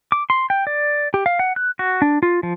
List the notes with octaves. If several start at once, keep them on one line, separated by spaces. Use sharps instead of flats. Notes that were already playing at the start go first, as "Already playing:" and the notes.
D6
C6
G5
D5
G4
F5
F#5
F#6
F#4
D4
F4
F3